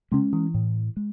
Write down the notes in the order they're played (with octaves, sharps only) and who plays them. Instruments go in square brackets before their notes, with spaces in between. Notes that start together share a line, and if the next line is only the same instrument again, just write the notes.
[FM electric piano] C#3 [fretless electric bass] G#3 C#4
[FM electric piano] E3
[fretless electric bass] A2
G#3